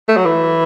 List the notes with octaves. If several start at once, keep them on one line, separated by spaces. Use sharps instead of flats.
A3
F#3
E3